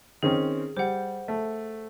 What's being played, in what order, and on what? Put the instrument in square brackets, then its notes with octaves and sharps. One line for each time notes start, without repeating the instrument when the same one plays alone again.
[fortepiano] D#3 C4 C#4 [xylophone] G#4
[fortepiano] G3 [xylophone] C5 F#5
[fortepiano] A3